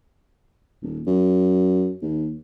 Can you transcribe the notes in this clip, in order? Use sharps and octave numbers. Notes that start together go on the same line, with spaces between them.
D#1
F#2
D#2